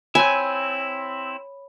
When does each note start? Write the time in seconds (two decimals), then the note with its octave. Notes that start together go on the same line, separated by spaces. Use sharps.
0.15 C4 E4 C#5 G#5 B5